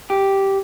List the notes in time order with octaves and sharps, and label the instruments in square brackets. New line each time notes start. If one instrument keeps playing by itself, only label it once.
[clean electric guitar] G4